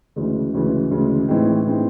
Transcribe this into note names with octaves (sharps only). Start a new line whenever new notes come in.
D2 C#3 E3 G#3
D2 C#3 E3 G#3
D2 C#3 E3 G#3
A2 E3 G#3 C4 D#4
A2 E3 G#3 C4 D#4